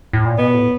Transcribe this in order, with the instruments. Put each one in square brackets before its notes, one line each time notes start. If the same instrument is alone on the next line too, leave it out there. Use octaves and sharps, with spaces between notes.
[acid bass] A2
A#2
[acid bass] B2 [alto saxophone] B3
[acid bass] A2